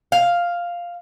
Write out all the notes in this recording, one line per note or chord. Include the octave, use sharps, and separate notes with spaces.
F5